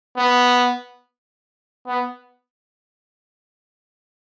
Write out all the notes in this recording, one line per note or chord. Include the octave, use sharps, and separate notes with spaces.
B3
B3